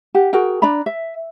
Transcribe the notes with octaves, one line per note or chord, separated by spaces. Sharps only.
G4 F#5
F#4 G#4 A#4 G5
D4 D5 A#5 B5
E5